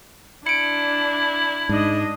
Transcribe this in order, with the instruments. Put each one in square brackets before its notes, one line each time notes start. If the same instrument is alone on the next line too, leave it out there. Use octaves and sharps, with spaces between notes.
[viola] D4 [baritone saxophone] E4 [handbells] C#7 D7
[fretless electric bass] G#2 [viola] D4 D#5